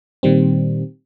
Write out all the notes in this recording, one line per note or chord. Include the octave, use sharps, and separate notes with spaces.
A#2 D#3 G3 C4